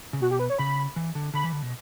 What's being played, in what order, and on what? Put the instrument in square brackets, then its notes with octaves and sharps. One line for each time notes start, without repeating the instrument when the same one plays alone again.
[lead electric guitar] C#3
[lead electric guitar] B2 [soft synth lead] F#4
[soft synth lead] G4
B4
C#5
[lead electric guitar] C#3 [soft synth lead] B5
[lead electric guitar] E3
D3
[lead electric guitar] D3 [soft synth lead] B5
[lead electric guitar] E3
D3
B2